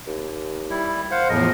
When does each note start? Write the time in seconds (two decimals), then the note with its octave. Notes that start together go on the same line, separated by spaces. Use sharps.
0.07 D#2
0.70 G3 E4
1.11 C5 F5 F#5
1.29 E2 A2 F3 G#3 A#4 D#5